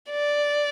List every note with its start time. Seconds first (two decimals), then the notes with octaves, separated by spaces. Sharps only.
0.11 D5